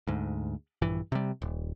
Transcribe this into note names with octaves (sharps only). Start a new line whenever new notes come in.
D2 G#2
A#1 G2 E3
C3 G3
D#1